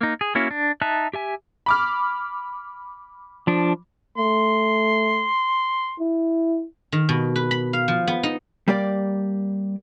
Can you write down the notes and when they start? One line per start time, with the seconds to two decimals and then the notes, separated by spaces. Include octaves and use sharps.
0.01 A#3 D#4
0.21 G#4
0.35 A#3 C#4 E4 F#4
0.51 D4
0.82 D#4 E5 A5 F#6
1.14 G4 E5 G#5
1.66 B5 D6 F6
3.47 F3 D4
4.18 A3 C6
5.99 E4
6.92 D#3
7.09 B2
7.36 B4
7.51 B5
7.73 F5
7.88 F3
8.07 B3
8.23 D#4
8.68 G3 A#3 G4 D5